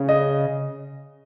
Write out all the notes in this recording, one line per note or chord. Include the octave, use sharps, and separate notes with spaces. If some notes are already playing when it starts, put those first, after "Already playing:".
Already playing: C#3
D#5